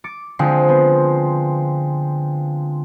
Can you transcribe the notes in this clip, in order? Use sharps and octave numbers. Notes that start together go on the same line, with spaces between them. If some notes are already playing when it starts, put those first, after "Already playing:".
D6 A6 C#7
D3 F3 G#3 C4 D#6
B3